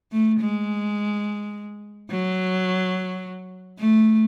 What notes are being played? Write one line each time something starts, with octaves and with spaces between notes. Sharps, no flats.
A3
G#3
F#3
A3